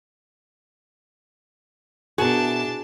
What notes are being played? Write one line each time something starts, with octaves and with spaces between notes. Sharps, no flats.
B2 D4 E4 F#4 G#4 A#4 A5